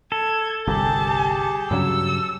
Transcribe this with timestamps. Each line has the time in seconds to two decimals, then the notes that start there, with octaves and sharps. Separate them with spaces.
0.12 A4 G#6
0.68 G1 C2 G4 G#4 A5
1.71 G2 C#3 F#3 E6